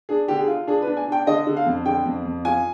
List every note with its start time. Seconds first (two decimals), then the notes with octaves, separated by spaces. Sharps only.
0.09 D4 G#4
0.28 D3 G4
0.38 G#4
0.48 F4
0.67 D4 G#4
0.82 B4
0.87 D4
0.97 G#5
1.08 D4 G5
1.27 D3 D#5
1.47 D3
1.57 F5
1.66 F2
1.85 D3 G5
2.06 F2
2.25 F2
2.45 F4 G#5